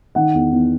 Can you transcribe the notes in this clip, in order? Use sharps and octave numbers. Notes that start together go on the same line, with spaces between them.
D#3 F#5
E2
E2